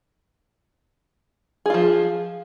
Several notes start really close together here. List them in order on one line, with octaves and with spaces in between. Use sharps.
G#4 F4 F3